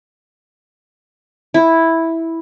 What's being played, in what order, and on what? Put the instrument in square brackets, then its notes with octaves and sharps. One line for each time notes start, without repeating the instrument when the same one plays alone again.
[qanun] E4